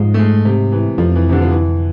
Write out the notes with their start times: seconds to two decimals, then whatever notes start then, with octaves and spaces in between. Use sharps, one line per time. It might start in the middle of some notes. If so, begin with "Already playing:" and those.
Already playing: G#2 F3 G#3
0.14 A3
0.19 G#3
0.45 C3
0.72 E3
0.98 F2 F3
1.15 E3
1.29 C3
1.32 D3
1.42 F3
1.51 E3